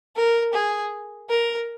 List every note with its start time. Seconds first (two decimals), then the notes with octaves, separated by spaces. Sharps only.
0.16 A#4
0.54 G#4
1.30 A#4